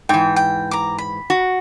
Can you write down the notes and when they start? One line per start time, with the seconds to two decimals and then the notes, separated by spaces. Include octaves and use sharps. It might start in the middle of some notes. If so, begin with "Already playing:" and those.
0.09 G#2 E3 G5
0.36 G5
0.71 A#5 D6
0.98 B5
1.30 F#4